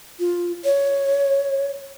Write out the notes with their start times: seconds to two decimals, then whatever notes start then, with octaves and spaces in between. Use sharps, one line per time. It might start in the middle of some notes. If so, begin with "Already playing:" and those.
0.19 F4
0.65 C#5